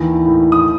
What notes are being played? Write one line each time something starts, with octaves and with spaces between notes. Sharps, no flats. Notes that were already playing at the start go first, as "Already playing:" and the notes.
Already playing: D#2 D#3 E3
A2
D#6